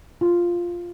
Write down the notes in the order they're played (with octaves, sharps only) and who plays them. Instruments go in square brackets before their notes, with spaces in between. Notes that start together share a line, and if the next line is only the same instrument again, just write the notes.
[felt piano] F4